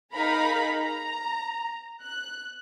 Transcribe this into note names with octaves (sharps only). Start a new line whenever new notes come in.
D#4 G#4 A#4 F5 A#5 B5
A#5
F#6